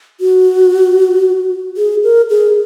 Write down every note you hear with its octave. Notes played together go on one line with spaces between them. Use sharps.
F#4
G#4
A#4
G#4